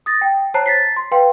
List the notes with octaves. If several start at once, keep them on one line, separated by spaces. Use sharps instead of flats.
D#6 A6 A#6
G5
C5 C#5 A5 A#5 F#6 C7
A6 B6 C7
C6
B4 F5 G5 C6